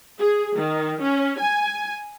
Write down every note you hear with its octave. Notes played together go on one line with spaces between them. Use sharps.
G#4
D#3
C#4
G#5